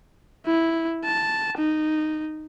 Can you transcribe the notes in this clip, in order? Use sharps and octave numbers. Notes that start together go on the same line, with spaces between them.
E4
A5
D#4